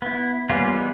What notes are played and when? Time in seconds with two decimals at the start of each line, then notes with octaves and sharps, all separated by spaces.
0.02 B3 E4
0.49 G3 A#3 B3 C#4 F4
0.72 E3 G3 G#3 B3